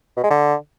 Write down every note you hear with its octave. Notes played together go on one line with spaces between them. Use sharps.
B2
G#3
D3